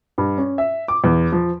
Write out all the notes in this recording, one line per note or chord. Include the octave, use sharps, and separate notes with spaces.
G2
C#4
E5
D6
E2
F3